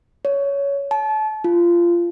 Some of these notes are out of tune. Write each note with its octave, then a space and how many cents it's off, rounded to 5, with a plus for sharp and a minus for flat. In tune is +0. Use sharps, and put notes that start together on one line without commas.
C#5 +15
A5 -30
F4 -20